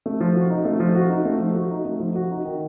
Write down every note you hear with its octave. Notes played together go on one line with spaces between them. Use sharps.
A3
F3
F#4
D#4
A3
F3
F#4
D#4
A3
F3
F#4
D#4
A3
F3
F#4
D#4
D#3